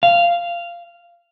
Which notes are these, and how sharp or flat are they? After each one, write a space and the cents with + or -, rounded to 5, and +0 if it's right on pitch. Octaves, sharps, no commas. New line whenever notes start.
F5 -10